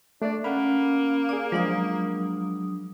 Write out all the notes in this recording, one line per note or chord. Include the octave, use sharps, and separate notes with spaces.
A3 D4 D5
A#3 C#4 F#5 B5
G#4 D5 D6
F3 F#3 G#3 D4 D#6